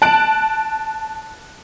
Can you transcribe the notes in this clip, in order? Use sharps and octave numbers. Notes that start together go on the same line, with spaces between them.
A5 F#6 D7